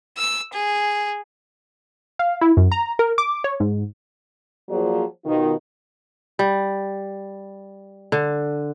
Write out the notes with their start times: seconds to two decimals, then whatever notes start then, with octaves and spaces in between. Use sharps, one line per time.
0.18 E6
0.53 G#4
2.19 F5
2.41 E4
2.57 F#2
2.72 A#5
2.99 A#4
3.18 D6
3.44 C#5
3.60 G#2
4.70 F3 F#3 A#3 G#4 C5 D5
5.25 B2 D#3 F4
6.39 G3
8.12 D3